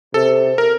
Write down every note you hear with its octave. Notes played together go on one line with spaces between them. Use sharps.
C3 A4
A#4